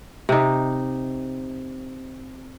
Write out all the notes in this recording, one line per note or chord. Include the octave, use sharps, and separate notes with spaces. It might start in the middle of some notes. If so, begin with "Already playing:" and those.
C3 D#4